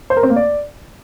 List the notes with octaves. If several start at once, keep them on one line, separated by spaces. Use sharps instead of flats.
C5
A#4
C4
A#3
D5